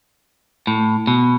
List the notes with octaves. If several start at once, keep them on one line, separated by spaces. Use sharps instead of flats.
A2
B2